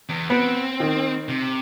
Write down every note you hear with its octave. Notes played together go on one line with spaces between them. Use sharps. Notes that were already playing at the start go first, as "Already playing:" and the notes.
E2
B3 C4
D#3
C3